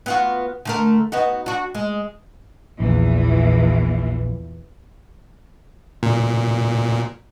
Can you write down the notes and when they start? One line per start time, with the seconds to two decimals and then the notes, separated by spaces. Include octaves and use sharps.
0.06 B3 F4 F#4
0.65 D3 A3 A#4
1.12 B3 D#4 F#4
1.46 D4 F#4
1.75 G#3
2.80 A#1 E2 A#2 E3
6.03 A#2